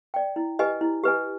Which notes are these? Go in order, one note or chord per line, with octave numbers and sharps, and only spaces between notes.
D5 G5
E4
G4 B4 D#5 G#5
E4
G4 B4 D#5 G#5